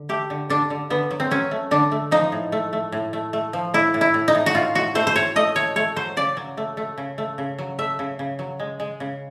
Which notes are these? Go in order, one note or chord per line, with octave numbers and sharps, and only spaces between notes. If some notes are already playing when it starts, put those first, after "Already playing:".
Already playing: D3
A3 G4
D3
D3 D4
D3
D3 B3
F#3
C4
F#3 C#4
A3
D3 D4
A3
F3 D#4
A2
A3
A3
A2
A3
A3
F3
A2 E4
A2
E4
A2
D#4
A2
F#4
A2 F4
A2 F#4
A3 C5
C5
A2 C#5
A3 D#5
A3 C#5
A3 C#5
F#3 C5
C#3 D5
F#3
A3
A3
C#3
A3
C#3
F#3
A3 E5
C#3
C#3
F#3
G#3
G#3
C#3